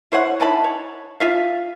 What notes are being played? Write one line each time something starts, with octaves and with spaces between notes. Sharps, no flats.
E4 C5 C#5 F#5
D#4 E4 A5 B5
C#5
F4 E5 F5